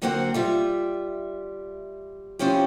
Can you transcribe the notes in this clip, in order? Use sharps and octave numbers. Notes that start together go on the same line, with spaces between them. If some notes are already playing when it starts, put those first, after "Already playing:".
D3 F#3 A#3 C4 F#4 F#5
G3 F4 E5
F3 C4 C#4 E4 G4